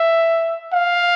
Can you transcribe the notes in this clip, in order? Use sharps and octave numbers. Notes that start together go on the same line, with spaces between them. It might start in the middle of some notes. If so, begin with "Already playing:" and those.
Already playing: E5
F5